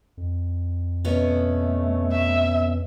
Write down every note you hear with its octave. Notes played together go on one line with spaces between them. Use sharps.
F2
B2 A3 B3 C#4
E5